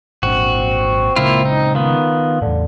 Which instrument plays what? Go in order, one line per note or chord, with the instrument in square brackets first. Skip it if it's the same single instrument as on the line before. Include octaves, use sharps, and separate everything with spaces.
[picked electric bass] G#1 A#2 D4 [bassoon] C4 [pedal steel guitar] F#4
[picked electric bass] A#2 C#3 G#3 [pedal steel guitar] A#3 E4 F4
[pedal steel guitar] D#4
[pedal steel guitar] D#3 B3 [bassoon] F4
[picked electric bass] E2 A2 [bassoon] D3